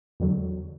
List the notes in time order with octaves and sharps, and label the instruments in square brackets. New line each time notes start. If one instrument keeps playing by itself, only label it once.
[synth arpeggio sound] E2 D3 F#3